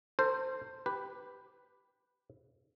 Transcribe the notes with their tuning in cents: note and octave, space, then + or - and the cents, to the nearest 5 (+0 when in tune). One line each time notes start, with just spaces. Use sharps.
A4 +40 C5 +0
G4 +0 B4 +0